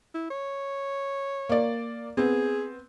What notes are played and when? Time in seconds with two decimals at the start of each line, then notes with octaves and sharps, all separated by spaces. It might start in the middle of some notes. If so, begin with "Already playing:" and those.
0.14 E4
0.30 C#5
1.49 A#3 D5
2.17 B3 C4 G#4